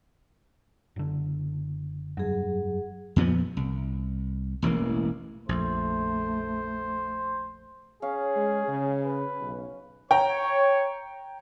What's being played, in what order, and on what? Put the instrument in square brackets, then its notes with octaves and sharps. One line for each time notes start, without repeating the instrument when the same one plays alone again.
[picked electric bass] F#1 D3
[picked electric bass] F1 G2 [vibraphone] F#3 G#4
[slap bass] F2 A#2 F3 B3
C2
E1 A1 E3 A#3
[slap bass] A#1 F2 [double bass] A3 [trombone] C5
[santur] C#4 F5 [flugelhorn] G#4
[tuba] G#3
C#3
[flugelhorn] B4
[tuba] B1
[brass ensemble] C#5 [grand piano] G5 A#5